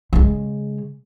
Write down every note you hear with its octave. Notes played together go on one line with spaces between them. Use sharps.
C#3 G#3